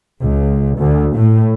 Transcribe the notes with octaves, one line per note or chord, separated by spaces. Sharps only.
C#2
D2
A2